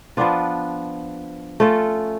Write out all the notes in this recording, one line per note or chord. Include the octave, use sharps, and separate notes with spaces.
F3 B3 D4 F4
A3 C#4 F4 A4